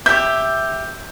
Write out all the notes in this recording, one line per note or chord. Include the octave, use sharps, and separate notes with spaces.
G4 E5 G6